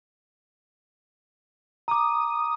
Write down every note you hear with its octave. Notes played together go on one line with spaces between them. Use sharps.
A#5 D6 D#6